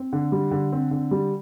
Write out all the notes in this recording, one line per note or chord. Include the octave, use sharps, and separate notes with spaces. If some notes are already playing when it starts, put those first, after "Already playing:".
Already playing: C4
D3
G3
D3
C4
D3
G3